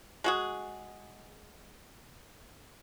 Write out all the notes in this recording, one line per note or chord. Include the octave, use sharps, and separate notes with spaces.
G#3 F#4 G#4